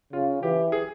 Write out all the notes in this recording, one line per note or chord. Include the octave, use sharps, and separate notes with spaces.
C#3 F4
E3 G4
G#4